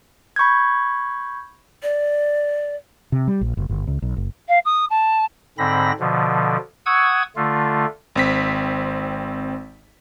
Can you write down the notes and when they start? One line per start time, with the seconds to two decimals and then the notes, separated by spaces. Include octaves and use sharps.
0.36 B5 C#6 G6 G#6
1.83 D5
3.12 C3
3.28 G3
3.41 A#1
3.57 F#1
3.69 G1
3.87 C#2
4.02 B1
4.16 F#1
4.48 F5
4.65 D#6
4.90 A5
5.58 G#2 D3 C4 B5 A#6
6.00 B2 D3 F3
6.86 F#5 C#6 D#6 E6 G#6
7.36 D3 A3 F4
8.16 G#1 C4 B6